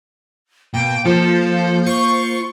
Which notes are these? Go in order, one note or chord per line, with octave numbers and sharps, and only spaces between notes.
B2 A#3 G5
F3 A4 C5
F4 C#6